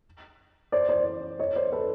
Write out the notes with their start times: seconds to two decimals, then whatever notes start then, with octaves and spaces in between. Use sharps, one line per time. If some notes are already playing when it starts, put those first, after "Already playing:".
0.72 C5 D5
0.89 C5 D5
1.39 C#5 D#5
1.56 C5 D5
1.72 A4 B4